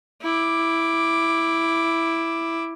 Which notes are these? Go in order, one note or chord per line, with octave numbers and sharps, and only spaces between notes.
E4 D6